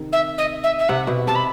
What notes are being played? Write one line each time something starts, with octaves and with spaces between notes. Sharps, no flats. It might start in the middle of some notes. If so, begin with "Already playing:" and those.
Already playing: C3 D#3
E5
D#5
E5
E5
C3 F#5
B2
C3 A5
B5